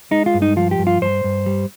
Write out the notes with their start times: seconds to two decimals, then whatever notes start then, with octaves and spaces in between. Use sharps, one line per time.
0.11 G#3 D#4
0.26 F4
0.34 G2
0.42 D#4
0.56 F3 F4
0.71 G4
0.79 G2
0.87 F4
1.02 G2 C5
1.24 G2
1.46 G3